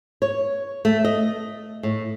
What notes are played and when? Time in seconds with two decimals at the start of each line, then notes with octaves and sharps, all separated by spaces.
0.22 C#5
0.85 A3
1.05 D#5
1.83 A2